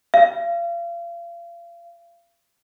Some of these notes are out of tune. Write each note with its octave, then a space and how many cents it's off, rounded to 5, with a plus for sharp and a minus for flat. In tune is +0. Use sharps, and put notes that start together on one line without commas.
F5 -35